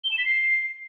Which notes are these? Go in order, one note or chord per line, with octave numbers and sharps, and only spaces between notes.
G7
E7
B6
C7